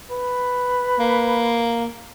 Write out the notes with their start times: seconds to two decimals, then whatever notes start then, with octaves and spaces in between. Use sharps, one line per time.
0.10 B4
0.99 A#3